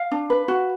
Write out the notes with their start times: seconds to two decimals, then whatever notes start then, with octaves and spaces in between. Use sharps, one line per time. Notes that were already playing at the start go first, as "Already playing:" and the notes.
Already playing: F5
0.11 D4
0.30 B4
0.48 F#4